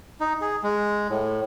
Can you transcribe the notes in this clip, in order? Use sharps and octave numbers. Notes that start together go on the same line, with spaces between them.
D#4
G#4
G#3
A2